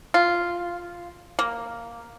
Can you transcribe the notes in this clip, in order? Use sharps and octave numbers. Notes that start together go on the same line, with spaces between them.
F4
A#3